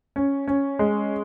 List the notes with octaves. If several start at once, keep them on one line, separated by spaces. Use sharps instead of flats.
C#4
C#4
G#3